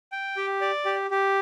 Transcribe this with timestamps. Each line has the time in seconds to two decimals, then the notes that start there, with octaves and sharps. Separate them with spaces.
0.12 G5
0.37 G4
0.61 D5
0.85 G4
1.11 G4